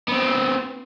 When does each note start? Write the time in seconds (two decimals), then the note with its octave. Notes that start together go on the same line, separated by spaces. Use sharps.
0.08 B3 C4